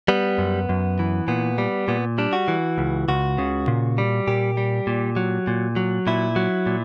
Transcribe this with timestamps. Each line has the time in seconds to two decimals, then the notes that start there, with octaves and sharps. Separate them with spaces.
0.08 G3 B3
0.38 F#2
0.69 F#2
0.99 E3
1.28 A#2 B3
1.58 G3
1.88 A#2 B3
2.18 G3 D4
2.33 F#4
2.48 E3
2.78 C#2
3.08 C#2 F#4
3.38 C#3
3.68 A#2
3.98 G3
4.27 A#2 G4
4.57 G3
4.87 A#2
5.16 F#3
5.47 A#2
5.76 F#3
6.07 A#2 E4
6.36 F#3
6.66 A#2